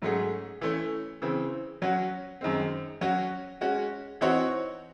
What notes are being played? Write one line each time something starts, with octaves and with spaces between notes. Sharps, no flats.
G#2 F#3 A3 C#4 G#4
E3 A3 C#4
C#3 E3 C4
F#3 C#4 F#4
F#2 D#3 G#3 C4
F#3 C#4 F#4
G#3 C#4 F#4
E3 C4 D#4 F#4 C#5